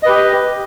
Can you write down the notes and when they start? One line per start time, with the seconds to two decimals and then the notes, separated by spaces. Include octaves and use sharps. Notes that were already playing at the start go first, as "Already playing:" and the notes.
0.03 D#5
0.06 B4
0.09 G4